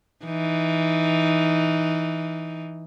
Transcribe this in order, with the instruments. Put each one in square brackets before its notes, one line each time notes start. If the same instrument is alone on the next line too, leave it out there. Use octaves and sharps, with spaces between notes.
[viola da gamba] E3 D#4